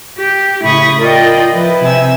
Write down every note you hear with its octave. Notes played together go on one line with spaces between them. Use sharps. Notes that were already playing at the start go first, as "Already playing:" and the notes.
G4
A2 C#3 E4 B5 C#6 D#6
F4 A#4 D5 D#5 G5
F3 E4 B4
C3 G#5 E6